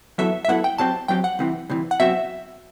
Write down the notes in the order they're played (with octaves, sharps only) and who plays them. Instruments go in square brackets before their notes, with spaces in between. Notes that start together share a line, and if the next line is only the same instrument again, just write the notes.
[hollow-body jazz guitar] F#2 F#3 B3 E4 A4 [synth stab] E5
[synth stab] E5
[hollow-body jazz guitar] F#2 F#3 B3 E4 A4 [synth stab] F#5
[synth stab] G5
[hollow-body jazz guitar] F#2 F#3 C4 G4 [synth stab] A5
[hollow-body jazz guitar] F#2 F#3 C4 G4 [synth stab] G5
[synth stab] F#5
[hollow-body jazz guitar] C2 C3 E3
C2 C3 E3
[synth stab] F#5
[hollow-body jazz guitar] B2 F#3 C4 F#4 [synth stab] E5